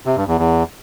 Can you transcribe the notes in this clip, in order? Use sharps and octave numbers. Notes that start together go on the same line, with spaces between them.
C3
G2
E2
E2